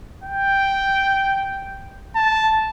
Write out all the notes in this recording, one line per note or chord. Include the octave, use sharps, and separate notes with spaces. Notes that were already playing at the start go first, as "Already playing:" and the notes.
G5
A5